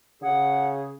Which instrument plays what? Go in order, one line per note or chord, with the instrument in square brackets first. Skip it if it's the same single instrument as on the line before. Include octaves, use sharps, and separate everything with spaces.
[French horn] C#3 [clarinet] G#4 [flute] F#5